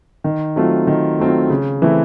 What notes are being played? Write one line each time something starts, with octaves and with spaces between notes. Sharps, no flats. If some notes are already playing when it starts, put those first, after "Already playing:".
D#3
F#3 A3 C4 F4
D#3
F#3 A3 C4 F4
C#3
E3 A3 C4 E4